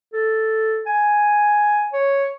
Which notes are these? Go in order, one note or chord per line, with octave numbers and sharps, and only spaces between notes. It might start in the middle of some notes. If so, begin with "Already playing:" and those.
A4
G#5
C#5